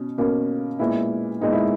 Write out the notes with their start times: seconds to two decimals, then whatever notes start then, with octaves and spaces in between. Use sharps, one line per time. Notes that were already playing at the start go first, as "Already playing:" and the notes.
Already playing: B2 C#4
0.18 B2 A#3 C#4
0.79 A#2 G#3 B3 E4
1.41 A#2 G#3 B3 D#4
1.52 E4